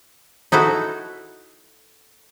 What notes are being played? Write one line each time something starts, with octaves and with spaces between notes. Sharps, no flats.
D#4 E4 F#4 A4